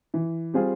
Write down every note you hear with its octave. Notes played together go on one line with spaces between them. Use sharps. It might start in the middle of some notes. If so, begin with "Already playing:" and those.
E3
G3 C4 F4 G#4